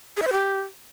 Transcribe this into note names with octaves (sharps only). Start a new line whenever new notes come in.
G#4
E5
C5
G4